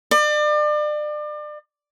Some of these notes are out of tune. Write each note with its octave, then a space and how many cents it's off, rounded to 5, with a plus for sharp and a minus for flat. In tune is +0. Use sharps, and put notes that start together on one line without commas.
D5 +35